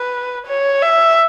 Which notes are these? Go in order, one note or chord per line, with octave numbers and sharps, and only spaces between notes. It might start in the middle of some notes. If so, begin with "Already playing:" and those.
Already playing: B4
C#5
E5